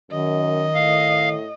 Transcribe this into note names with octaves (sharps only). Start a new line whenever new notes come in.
F#2 D#3 D#5
A2 F5